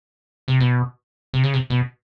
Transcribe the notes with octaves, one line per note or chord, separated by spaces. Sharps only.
C3
B2
C3
C#3
C3
B2